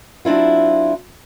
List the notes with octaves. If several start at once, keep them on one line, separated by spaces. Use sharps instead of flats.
F#3 C4 D4 E4 F4